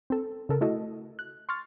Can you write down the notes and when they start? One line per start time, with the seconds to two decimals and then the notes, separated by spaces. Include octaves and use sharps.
0.10 C4 A4
0.49 C#3 A4 A#4
0.61 A3 E4 F#4 A4 D#5
1.19 F#6
1.49 C6 C#6 F6 A6